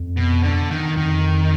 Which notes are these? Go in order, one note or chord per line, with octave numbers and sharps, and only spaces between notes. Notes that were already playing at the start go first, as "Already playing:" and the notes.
Already playing: F2
B2
D3
D#3
F2 D#3